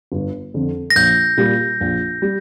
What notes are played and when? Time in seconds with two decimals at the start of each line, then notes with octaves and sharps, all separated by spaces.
0.12 G1
0.54 F2 D3
0.90 A#6
0.96 A#1 G6
1.37 A#2 G3
1.81 A#1
2.22 G3